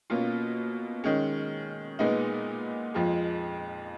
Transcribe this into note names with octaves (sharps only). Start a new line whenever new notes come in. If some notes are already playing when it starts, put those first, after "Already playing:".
B2 A#3 C#4 F4
D#3 G#3 C#4
A#2 G#3 B3 D#4
F2 F3 G#3